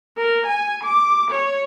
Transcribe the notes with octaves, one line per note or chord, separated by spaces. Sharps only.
A#4
G#5
D6
C#5